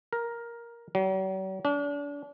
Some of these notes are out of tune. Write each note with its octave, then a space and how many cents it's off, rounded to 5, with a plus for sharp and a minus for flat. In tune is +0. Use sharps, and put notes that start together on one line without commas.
A#4 +10
F#3 +45
D4 -35